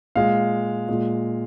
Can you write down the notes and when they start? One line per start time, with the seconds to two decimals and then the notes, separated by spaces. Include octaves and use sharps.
0.16 A#2 G#3 F5
0.89 A#2 G#3